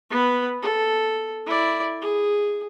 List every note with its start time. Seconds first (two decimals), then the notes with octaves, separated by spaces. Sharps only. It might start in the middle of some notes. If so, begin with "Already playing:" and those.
0.10 B3 B4
0.62 A4
1.46 E4 D5
2.02 G#4